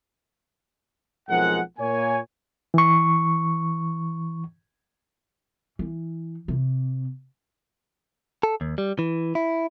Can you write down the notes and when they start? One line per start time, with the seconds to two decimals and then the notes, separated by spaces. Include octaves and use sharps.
1.29 B1 F3 G#3 C4 A#4 F#5
1.79 A#2 A#3 C#5 G#5
2.74 E3 C#6
5.79 E3
6.48 C3
8.43 A4
8.61 D#2
8.78 G3
8.99 E3
9.35 E4